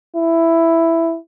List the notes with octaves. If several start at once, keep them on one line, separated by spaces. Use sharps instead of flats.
E4